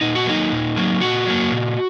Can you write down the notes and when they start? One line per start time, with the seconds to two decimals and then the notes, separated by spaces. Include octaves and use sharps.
0.01 A#2 D#4
0.15 F#4
0.26 F#3 A#3 D#4
0.52 A#2
0.76 F#3 A#3
1.01 A#2 F#4
1.27 F#3 A#3
1.51 A#2